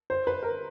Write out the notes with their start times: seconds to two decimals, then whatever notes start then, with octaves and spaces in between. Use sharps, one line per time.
0.10 C5
0.27 B4
0.43 A#4